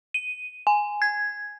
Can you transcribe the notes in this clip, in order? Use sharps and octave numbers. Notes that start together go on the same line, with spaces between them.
D#7
G#5
G#6